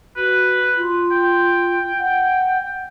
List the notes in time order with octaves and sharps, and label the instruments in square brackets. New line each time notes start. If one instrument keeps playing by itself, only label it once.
[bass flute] F#4 [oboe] B4
[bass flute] F4
[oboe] G5
[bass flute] F#5